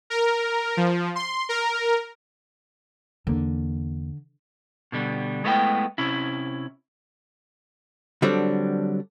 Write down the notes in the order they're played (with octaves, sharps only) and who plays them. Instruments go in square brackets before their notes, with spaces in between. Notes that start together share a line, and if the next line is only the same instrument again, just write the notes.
[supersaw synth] A#4
F3
C6
A#4
[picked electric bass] E2 A#3 [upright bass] D3
[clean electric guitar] B2 D3 G3
G#3 A3 B3 E4 E5 G5
C3 C#4 E4
[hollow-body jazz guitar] D3 F#3 G3 C4 D4